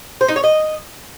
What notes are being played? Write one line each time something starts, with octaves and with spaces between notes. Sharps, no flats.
C5
D#4
C#5
D#5